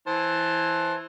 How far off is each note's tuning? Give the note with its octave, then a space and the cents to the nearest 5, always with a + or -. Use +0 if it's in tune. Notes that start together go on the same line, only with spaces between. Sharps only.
E3 +0 C5 +15 A5 -5